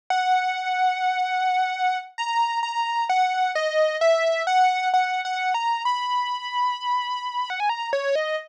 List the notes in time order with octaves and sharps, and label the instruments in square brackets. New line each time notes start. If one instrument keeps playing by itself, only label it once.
[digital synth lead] F#5
A#5
A#5
F#5
D#5
E5
F#5
F#5
F#5
A#5
B5
F#5
G#5
A#5
C#5
D#5